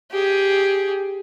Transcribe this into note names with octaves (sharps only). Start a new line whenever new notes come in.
G4 G#4